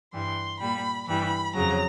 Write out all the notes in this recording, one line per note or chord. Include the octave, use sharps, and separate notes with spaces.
G2 E3 G3 C6
A#2 G3 B5
G2 E3 G3 B5
F2 C#3 F#3 A#5